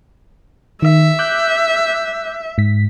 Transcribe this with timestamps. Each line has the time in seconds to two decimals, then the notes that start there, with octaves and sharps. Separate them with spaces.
0.82 D#3 E5
1.19 D6 F#6 G6
2.58 G#2 B6